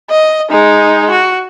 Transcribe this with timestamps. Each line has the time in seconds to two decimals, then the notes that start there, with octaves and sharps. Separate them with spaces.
0.10 D#5
0.51 G#3 D#4
1.11 F#4